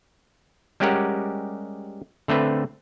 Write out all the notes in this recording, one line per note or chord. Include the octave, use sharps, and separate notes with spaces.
G3 G#3 C#4 G4 A#4 F#5
D3 A3 C4 B4